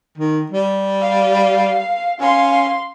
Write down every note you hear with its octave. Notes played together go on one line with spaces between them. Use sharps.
D#3
G3
F5
C#4 F5 C6